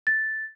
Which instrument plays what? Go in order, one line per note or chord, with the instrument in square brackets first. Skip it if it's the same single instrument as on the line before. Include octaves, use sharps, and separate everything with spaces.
[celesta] A6